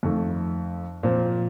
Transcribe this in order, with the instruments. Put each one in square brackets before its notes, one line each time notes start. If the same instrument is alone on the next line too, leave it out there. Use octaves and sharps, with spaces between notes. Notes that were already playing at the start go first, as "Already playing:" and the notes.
[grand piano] F2 D#3 A3
A#2 F3 C4